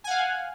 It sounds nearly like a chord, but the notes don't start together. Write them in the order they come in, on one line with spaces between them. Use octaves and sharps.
G#5 F#5 F5